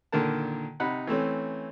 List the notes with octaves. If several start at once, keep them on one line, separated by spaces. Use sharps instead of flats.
A#2 D3 D#3 A#4 A5
C3 D#4 F#5 B5
E3 A3 C4 C#4